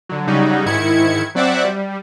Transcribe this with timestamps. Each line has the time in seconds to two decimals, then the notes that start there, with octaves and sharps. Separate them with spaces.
0.09 D3 F#3
0.27 C#3 F#3 G3 D#4 F#4
0.66 G#2 D#3 E4 G#6 C#7
1.35 F#3 C4 D5 E5 F#5 D6
1.65 G3